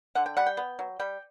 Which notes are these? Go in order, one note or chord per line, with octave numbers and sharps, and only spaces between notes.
D3 F#5
G5
G3 F#5
G5
B3
F#3
G3 G5